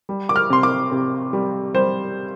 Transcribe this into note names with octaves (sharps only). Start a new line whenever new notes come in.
G3
D6
F6
C3 C6
D6
C3
G3
G3 C5